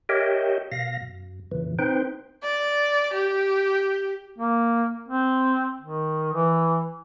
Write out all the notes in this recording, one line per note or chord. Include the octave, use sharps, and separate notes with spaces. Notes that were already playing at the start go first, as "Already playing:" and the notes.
G4 A#4 C#5 D#5 E5 G5
B2 F5 A#6
F#2
F2 A#2 C#3 E3
C4 D#4 B4 C5 G5
D5
G4
A#3
C4
D#3
E3